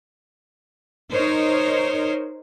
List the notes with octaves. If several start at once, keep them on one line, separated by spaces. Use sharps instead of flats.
D#4 A#4 C5 C#5